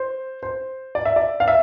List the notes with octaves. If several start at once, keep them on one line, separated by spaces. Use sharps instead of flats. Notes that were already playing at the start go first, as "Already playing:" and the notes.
Already playing: C5
C5
D5
E5
D5
F5
E5